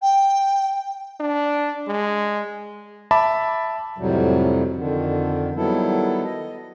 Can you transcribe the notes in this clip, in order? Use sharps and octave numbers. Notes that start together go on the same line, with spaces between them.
G5
D4
G#3
E5 A5 B5 D6
F2 A2 C3 F#3 G3
F2 D3 D#3
D#3 F#3 G3 B3 E4 A4
D#5